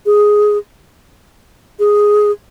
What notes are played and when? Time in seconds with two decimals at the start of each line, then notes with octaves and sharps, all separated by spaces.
0.06 G#4
1.79 G#4